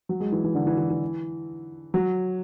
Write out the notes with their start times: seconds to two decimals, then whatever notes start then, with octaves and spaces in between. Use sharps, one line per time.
0.09 F#3
0.20 G#3
0.32 E3
0.44 E3
0.55 D3
0.67 E3
0.78 E3
0.90 E3
1.94 F#3